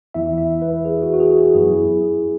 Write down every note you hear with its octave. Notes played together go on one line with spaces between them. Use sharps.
E2 E3 B3 E4 E5
E5
B4
G#4
F#4
F#4
G#4
G#4
F#2 F#3 B3 E4 G#4